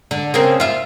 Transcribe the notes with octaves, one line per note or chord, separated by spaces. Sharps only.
D3
C#3 A#3 C4
F4 E5